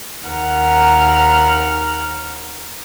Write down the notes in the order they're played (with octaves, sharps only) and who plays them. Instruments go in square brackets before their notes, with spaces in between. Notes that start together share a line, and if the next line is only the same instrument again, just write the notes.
[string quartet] D#2 A#4 F#5 F6